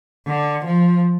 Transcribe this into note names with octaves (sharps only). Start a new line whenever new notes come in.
D3
F3